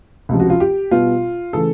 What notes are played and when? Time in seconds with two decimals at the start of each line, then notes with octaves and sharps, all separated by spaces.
0.29 C#2 C3 F3
0.40 F#4
0.50 F4
0.60 G4
0.91 B2 G3 B3 F4
1.53 C#3 E3 A3 A4